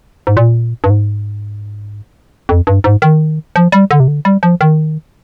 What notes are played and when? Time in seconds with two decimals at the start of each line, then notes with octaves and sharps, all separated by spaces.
0.27 G#2
0.37 A#2
0.84 G2
0.90 G#2
2.49 F2
2.67 G2
2.84 G#2
3.02 D#3
3.56 F3
3.72 G3
3.91 D3
4.00 C3
4.08 D3
4.25 G3
4.43 F3
4.61 D#3